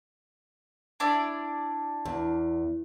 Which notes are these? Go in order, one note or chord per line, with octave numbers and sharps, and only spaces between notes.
D4 E4 D5
E2